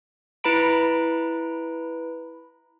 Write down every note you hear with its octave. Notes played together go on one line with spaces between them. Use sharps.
E4 B4 A#5 B5 D7